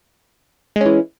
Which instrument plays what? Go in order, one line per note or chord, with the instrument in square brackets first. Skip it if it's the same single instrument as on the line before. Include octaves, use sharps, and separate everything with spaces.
[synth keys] G#3
C#4
E3